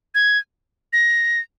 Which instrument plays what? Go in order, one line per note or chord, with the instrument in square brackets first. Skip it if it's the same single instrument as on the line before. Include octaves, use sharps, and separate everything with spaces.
[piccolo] G#6
A#6